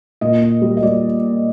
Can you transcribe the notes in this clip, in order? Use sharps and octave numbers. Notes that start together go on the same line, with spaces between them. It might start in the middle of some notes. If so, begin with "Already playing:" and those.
A#2 D#5
A#2
G3
D#5
G3 D5